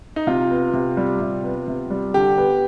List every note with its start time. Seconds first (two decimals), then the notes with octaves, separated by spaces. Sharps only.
0.16 D#4
0.27 C3 F4
0.51 B3
0.73 C3
0.97 G3
1.21 C3
1.44 B3
1.68 C3
1.90 G3
2.14 D3 G4
2.38 B3